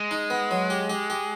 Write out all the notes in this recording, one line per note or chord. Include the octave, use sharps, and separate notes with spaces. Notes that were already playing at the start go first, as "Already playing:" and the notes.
Already playing: G#3
D#4
B3
F#3
G4
G4
G4